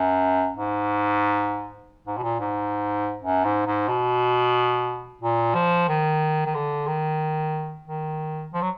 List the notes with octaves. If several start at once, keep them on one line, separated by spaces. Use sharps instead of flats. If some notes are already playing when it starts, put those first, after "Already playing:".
Already playing: F#2
G#2
G#2
B2
A#2
G#2
F#2
G#2
G#2
B2
A#2
F3
D#3
D#3
D3
D#3
D#3
F3
F#3